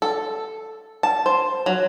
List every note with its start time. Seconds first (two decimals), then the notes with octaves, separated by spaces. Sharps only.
0.02 A4
1.03 A5
1.26 C5
1.66 F#3